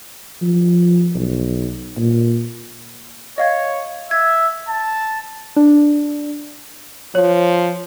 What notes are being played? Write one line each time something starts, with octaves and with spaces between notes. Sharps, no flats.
F3
B1
A#2
C#5 D#5 F5 G#6
E5 G#6
A5
D4
F3 C#5